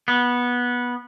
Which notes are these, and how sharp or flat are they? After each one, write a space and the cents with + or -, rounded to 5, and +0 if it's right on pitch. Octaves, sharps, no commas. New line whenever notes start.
B3 -15